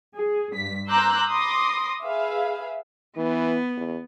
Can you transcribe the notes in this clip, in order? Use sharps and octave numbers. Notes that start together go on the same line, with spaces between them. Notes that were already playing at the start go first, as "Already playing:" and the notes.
G#4
G2 B6
A#5 C6 D6 E6 F#6 G6
B5 C6 D6 D#6 A#6
G#4 B4 E5 F5
E3 B3
E2